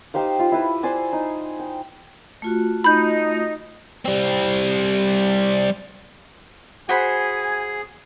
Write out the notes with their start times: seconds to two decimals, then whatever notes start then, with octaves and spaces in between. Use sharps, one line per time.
0.14 D#4 G4 C5 F5
0.39 F4
0.52 E4 B4
0.83 C5 D5 G#5
1.13 D#4
1.59 G5
2.42 A3 F4 F#4
2.84 D#4 B5 G6
4.05 G3 C4
6.89 F#4 G#4 C5 G#5 B5